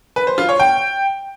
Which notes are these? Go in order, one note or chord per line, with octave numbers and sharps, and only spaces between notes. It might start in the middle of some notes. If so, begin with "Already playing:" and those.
B4
C5
F4
C#5
G5